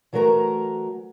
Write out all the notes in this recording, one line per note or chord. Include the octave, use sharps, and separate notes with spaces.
E3 F#3 A3 A#4 A#5